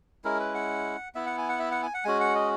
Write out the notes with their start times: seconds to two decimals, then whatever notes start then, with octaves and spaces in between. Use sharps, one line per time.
0.24 G#3 C#4 E4 A#4
0.40 B4
0.54 F#5
1.15 B3 E4 E5
1.26 F#5
1.38 G#5
1.49 F#5
1.59 E5
1.71 F#5
1.83 G#5
1.94 F#5
2.05 G#3 C#4 F#4 G#5
2.21 F#5
2.35 D#5